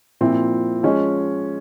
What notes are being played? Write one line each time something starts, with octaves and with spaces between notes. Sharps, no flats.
A#2 F3 C4 E4
F3 G#3 C#4